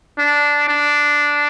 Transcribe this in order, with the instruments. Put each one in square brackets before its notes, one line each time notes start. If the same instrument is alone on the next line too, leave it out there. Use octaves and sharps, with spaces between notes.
[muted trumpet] D4
D4